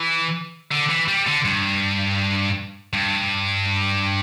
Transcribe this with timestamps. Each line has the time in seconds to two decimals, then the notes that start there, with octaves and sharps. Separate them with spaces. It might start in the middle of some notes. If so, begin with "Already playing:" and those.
Already playing: E3
0.72 D3
0.90 E3
1.08 G3
1.27 D3
1.45 G2
2.93 G2